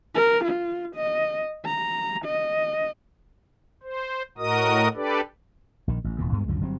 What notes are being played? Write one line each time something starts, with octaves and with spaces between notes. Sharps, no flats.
A#4
F4
D#5
A#5
D#5
C5
A2 F#4 A#4 D#5 D#6
D4 G4 A4 B4 D5
A#1 D#3
A1
E1 E2 A#2
D2 G2 G#3 B3
C#2 F#2 D3 F3
G1 F#3 G3 C4